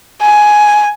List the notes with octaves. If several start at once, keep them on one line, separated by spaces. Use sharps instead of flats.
G#5